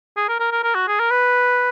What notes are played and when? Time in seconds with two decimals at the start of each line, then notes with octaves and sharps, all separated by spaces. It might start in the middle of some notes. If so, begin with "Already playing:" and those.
0.17 G#4
0.29 A#4
0.40 A#4
0.52 A#4
0.63 A#4
0.75 F#4
0.88 G#4
0.99 A#4
1.11 B4